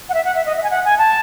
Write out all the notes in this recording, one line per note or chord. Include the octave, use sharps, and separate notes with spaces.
F#5
E5
F#5
E5
D#5
E5
G#5
F#5
G#5
A5